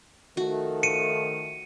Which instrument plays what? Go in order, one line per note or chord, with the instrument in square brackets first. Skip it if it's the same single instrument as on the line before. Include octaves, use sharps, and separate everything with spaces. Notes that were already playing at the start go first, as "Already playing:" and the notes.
[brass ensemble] D#3 F3 A3 [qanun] F#4
[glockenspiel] C#7 D#7